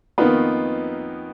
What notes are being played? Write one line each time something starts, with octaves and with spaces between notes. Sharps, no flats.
F2 D#3 A#3 B3 D#4 F4 B4